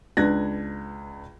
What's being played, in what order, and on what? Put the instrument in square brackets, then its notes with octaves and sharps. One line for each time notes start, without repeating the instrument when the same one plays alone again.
[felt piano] C#2 D4 B4 F#6 G#6 A#6